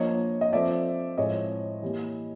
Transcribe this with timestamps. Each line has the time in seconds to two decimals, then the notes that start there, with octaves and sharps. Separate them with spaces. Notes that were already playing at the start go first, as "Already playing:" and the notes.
Already playing: F3 A#3 D4 C#5 D#5
0.41 D#5
0.52 F3 A3 C4 D5 E5
1.18 A2 F3 G#3 C4 C#5 D#5
1.82 E3 G3 A#3